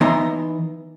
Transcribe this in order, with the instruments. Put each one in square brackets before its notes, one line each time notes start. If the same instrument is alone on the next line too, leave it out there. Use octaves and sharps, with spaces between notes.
[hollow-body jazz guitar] E3 B3 D#4 A#5 C6